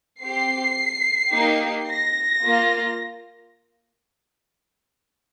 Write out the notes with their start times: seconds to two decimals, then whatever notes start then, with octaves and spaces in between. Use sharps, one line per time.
0.23 C4 G4 C7
1.33 A#3 D#4 G4
1.89 A#6
2.43 A#3 F4